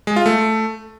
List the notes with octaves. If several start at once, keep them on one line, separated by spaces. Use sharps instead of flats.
G#3
F4
A3